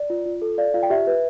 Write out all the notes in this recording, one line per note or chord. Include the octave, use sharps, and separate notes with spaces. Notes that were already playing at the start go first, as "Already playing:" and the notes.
Already playing: D5
F4
F4
A4
D5 F5
F4 F5
G5
G4 E5
B4